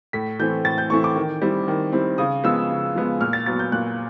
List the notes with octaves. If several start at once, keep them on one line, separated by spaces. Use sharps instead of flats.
A2 B6
E3 A3 C4 E4 G6
A2 A6
G6
E3 A3 C4 E4 C#6
D6
D#3
G3 C4 E4
D#3
G3 C4 E4
C#3 D#6
F3 G#3 B3 E6
C#3
F3 G#3 B3
A#2 F6
A6
F#3 B3 A6
G6
A#2 F#6